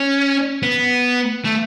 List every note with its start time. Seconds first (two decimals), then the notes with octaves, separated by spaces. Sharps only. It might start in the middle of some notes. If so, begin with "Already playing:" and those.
Already playing: C#4
0.62 B3
1.44 A3